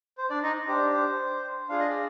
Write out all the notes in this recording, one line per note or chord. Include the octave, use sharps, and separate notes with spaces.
C5
D4 D5
D#4 D#5
D4 G4 C5
C5
D4 F4 G#4 F5
D#5
D5